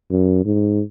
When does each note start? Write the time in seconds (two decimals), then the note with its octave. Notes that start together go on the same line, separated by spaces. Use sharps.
0.11 F#2
0.46 G#2